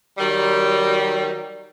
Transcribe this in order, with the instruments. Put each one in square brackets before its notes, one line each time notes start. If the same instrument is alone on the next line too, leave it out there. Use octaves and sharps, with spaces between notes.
[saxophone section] D#3 F#3 G3